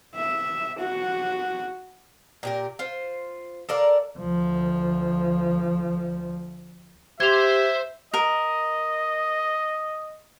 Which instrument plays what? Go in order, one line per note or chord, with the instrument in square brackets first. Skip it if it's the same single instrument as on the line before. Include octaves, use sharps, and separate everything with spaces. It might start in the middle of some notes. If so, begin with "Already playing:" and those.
[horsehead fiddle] E5
F#4
[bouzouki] A#2 G4 A#4
F4 C5
A4 A#4 D5 F5
[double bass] D2 F3
[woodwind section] G4 [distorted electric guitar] C5 C6 [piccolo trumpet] E5 [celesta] G#6 F7
[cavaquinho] A#4 [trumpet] D#5